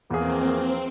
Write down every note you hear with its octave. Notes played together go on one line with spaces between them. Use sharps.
E2 E3 F3 A#3 C4 G#4